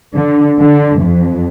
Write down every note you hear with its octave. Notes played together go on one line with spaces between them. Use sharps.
D3
D3
F2